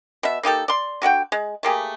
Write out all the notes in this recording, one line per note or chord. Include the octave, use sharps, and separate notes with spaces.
B2 E5
A#3 D#4 G4 A4
D5 C6
D3 F#4 F#5 G5
G#3
A3 A#3 G4 G#4